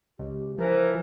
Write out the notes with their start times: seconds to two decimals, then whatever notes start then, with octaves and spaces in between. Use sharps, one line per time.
0.19 C#2 G4
0.58 E3 F3 A#4 C5